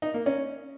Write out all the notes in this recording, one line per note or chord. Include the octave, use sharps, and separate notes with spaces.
D#4
A#3
C#4